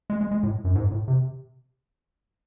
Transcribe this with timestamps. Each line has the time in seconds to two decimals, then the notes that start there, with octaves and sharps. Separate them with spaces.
0.10 G#3
0.21 G#3
0.31 G#3
0.43 A2
0.65 F#2
0.75 G#2
0.91 A2
1.08 C3